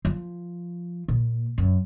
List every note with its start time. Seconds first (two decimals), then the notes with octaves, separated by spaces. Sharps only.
0.05 F3
1.08 A#2
1.58 F#2